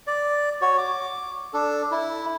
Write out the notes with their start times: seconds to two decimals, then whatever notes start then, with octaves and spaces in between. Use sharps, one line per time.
0.07 D5
0.61 F#4 C#5
0.78 D6
1.54 D4 A4
1.91 E4